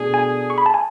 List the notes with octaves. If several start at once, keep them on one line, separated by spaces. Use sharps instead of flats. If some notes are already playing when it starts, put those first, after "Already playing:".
Already playing: B2 A3 D4 G#4
G#5
C#6
B5
A5
G#5